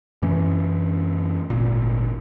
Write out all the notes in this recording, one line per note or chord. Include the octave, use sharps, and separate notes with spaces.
F#2 E3 A3 C#4
D1 G#1 A#2